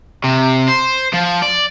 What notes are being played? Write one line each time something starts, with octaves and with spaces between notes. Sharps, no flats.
C3
C5
F3
D5